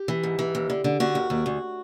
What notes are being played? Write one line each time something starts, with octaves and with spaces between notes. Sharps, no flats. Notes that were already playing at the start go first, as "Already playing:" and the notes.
Already playing: G4
E3
G#2
E3
D#2
D3
D3
D3 F#4
D#2
D#2
D2